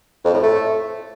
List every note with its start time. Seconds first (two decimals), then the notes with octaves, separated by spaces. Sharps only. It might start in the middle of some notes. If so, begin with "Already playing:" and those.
0.24 F2
0.34 A2
0.43 A3